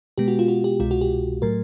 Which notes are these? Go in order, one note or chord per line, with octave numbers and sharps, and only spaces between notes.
B2 G#3 B3 G4
F#4
F4
F#4
G4
C2 B2 G#3 F4
F#4
G4
A2 F#3 A3 A#4